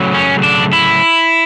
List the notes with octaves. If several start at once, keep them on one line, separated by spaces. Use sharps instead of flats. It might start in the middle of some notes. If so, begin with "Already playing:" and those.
Already playing: C#3 F#3 A3
C#4
D4
E4